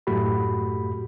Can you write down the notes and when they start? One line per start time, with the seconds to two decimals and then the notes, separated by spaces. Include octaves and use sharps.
0.07 F#2 A2 A3 F#4 G4 B5